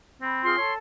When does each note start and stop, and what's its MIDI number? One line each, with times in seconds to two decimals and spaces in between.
0.22 0.57 60
0.22 0.40 83
0.44 0.55 65
0.44 0.55 68
0.44 0.74 84
0.44 0.55 89
0.58 0.77 69
0.58 0.73 73